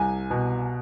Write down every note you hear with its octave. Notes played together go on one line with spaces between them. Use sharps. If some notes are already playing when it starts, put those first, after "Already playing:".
Already playing: C2 G#5
B2